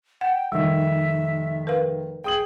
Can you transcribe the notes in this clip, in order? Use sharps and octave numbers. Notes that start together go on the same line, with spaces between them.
F#5 G5
F1 D#3 G3 E5
A#4 B4 F5
G#4 G5 D#6 F#7